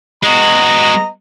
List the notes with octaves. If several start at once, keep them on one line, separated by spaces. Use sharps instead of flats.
G#3 B3 F#4 D#5 A#5